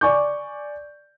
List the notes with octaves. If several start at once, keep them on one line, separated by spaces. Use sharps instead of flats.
D5 G#5 C#6 D6 G6